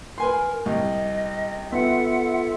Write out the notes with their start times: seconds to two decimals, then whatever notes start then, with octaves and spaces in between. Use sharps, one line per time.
0.18 A#4 B4 G#5 C6
0.66 C2 D#5
1.72 B3 F4 A4 E5 F#5